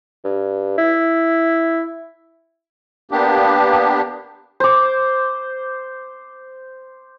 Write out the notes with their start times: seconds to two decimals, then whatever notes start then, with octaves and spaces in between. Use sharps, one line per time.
0.25 G2
0.78 E4
3.11 A#3 B3 D4 G4
4.60 C5 D6